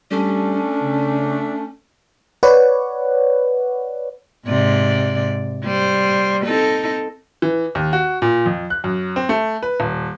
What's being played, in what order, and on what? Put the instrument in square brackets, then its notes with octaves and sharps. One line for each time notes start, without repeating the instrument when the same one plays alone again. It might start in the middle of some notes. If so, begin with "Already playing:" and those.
[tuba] G3 [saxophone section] A3 D4 [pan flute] C#4
[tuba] C#3
[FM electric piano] B4 C#5 D5 F#5
[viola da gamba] G#2 C3 D5
G3 C5
C4 D#4 A4
[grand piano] E3
D#2
F#4
A#2
F2
F#6
F#2
C4
A3
B4
D#1